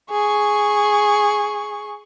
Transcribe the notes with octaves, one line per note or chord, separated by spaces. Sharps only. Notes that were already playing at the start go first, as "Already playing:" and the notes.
G#4 C#6